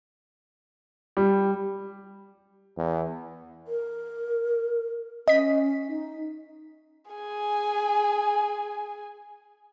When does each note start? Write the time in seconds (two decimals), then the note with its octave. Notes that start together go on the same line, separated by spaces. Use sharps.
1.17 G3
2.77 E2
3.67 A#4
5.28 C#4 D#5 B6
5.88 D#4
7.11 G#4 G#5